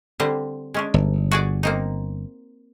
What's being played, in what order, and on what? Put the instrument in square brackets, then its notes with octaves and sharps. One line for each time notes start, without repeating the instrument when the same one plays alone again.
[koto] D3 G3 C4
G#3 C#4 D4
[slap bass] G1
[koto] F#4 G#4 D5
A#3 C4 D#4